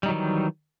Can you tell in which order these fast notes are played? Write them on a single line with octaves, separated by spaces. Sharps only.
G3 D#4 F#3 D#3 E3